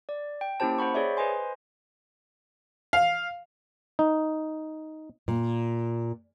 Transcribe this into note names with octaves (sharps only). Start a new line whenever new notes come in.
D5
G5
A#3 C#4 E4 G4 C5 A5
C5 F#5 B5 C#6
G#4 C#5 D5 E5
B4 C5 D#5 G#5 C6
F5
D#4
A#2